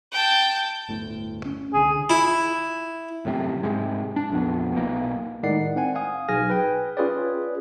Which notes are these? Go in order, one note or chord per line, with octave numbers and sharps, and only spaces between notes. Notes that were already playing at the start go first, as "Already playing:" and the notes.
G5 A5
G1 D2 A2
C#4
C2 D3 G#4
E4
G1 F#2 A2 C3
G#2 C3 G#3
D4
A#1 F2 B3
B1 B2 A#3
A2 D#3 G#3 D5 F#5 C7
C4 F#5 G#5
F5 G#5 D#6
B1 G#4 G#5 F6 A#6
B4 G5
C#4 F4 G#4 B4 C#5 D5